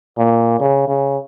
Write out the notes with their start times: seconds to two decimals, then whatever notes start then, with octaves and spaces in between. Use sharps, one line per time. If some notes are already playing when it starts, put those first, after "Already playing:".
0.18 A#2
0.60 C#3
0.88 C#3